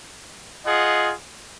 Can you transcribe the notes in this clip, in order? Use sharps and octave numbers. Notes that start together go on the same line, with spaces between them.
F4 G#4 D#5 F#5